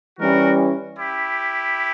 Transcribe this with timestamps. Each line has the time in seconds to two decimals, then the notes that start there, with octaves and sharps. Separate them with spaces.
0.19 E3 G3 C#4 E4 F#4 A#4
0.98 E4 G4